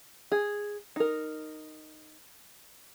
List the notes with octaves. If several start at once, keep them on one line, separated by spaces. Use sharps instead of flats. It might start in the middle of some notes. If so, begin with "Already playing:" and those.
G#4
D#4 A#4